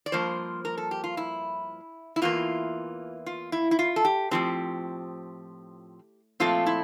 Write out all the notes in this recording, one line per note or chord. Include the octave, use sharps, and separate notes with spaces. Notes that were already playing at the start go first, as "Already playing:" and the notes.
D5
G2 F3 A#3 C5
A#4
A4
G4
F4
E4
E4
E2 E3 A#3 F4
F4
E4
E4
F4
A4
G4
A2 F3 C4 G4
A#2 F3 A3 C4 F4
E4